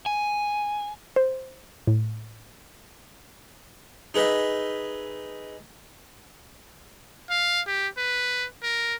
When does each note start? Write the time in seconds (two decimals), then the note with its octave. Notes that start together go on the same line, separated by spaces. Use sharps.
0.06 G#5
1.16 C5
1.87 A2
4.14 D#4 G#4 B4 D#5 E5
7.30 F5
7.67 G4
7.98 B4
8.63 A#4